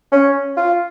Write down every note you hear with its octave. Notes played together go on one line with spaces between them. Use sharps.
C#4
F4